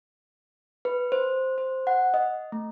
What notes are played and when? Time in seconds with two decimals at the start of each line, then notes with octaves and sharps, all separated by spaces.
0.85 B4
1.12 C5
1.58 C5
1.87 F#5
2.14 D#5
2.52 A3